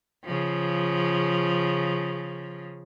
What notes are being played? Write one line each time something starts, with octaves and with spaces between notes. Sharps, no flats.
C#3 F3